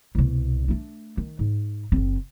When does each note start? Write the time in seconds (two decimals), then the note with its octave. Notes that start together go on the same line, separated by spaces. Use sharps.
0.15 C2 B2
0.68 A3 D4
1.17 D#3
1.39 G#2
1.92 F#1 C4